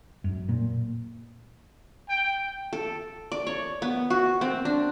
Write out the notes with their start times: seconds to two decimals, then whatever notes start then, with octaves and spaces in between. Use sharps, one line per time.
0.24 F#2
0.49 A#2
2.09 G5
2.73 A4
3.32 D5
3.47 C#5
3.82 B3
4.10 F#4
4.41 C4
4.65 D4